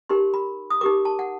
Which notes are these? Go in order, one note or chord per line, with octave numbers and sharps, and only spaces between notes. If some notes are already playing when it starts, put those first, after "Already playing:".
D#4 G4 A#4 C6
B5
D#6
D#4 G4 A#4 D6
A5
F#5